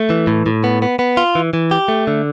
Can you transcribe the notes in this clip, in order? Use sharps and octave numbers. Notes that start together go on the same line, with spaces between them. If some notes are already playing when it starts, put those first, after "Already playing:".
Already playing: A3
E3
A2
A2
B3
B3
B3
F4
E3
E3
G4
A3
D3